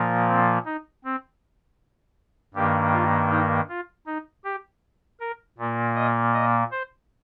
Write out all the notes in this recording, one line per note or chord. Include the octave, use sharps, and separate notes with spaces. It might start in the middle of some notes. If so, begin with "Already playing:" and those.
Already playing: A#2 F3 A#3
C4
D#4
C4
G2 D#3 A#3 G4
F4
D#4
F4
D#4
G4
A#4
A#2 A#3
D#5
D#5
C5